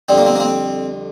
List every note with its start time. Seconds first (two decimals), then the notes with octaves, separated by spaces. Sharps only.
0.09 F2 D3 G3 C4
0.18 A#3
0.26 C4
0.36 A#3
0.40 C4